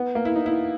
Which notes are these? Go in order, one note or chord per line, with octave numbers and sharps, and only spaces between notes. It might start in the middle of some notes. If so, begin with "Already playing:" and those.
Already playing: B3
A#3
E4
D#4
E4